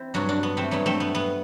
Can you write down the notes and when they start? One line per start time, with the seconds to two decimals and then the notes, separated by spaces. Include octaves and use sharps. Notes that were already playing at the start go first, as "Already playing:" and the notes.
Already playing: C4 E4
0.14 G2 F#3 D4 F#4
0.29 D4 F#4
0.43 B3
0.57 A3 C4
0.71 G2 F#3 B3
0.86 A3 C4
1.00 B3
1.15 B3